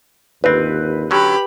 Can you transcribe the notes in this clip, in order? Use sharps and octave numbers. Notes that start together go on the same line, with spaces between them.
G1 D#2 C4 B4
D3 F#3 C#4 G4 B5